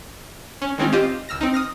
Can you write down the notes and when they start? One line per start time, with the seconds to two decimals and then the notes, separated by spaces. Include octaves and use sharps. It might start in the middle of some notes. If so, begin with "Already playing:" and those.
0.62 C#4
0.78 D#3 G#3 C4 C#4 D#4 F4
0.92 C4 F4 G4 C5 D#5
1.29 C#2 E6 F6 A#6
1.41 C4 D#4
1.54 D#6 F6 A#6